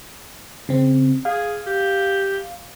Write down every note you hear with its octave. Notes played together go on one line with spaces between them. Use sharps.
C#3 C4
G#4 F5
G4